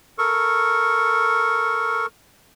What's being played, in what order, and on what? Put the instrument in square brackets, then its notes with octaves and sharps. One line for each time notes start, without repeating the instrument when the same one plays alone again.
[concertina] A4 A#4 C#6